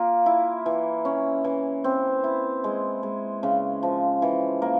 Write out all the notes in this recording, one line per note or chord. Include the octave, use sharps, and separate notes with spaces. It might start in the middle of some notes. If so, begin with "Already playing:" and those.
Already playing: A#3 F4
E4
E3
C#4
E3
C4
E4
G#3
G#3
C#3
F3
E3
A#3